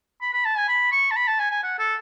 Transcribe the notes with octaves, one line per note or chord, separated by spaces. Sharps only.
B5
B5
A5
G#5
B5
C#6
A5
B5
A5
G#5
G#5
F#5
A4